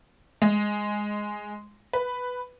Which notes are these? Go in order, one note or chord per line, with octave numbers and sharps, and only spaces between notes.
G#3
B4